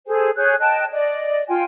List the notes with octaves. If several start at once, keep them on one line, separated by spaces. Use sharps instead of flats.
G#4 A4 C5 G#5
G#4 C#5 F#6 G6
D#5 G5 A5 F#6
D5 D#5
F4 G5 G#5